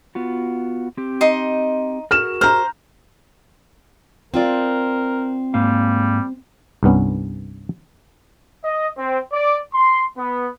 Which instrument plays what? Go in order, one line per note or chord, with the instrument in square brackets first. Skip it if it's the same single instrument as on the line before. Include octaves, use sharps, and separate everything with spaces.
[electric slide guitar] B3 F4 F#4
C4 G4
[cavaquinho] D#4 D#5 C6
[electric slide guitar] F#4 G#4 A#4 [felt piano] F6 E7
[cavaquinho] C5 [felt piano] A#5 F6
[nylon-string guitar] C4 F4 D5 [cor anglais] A#4
[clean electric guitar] G#2 A#3 F5 [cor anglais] G3
[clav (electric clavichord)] C2 G2 B3 C#4
[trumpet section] D#5
C4
D5
C6
B3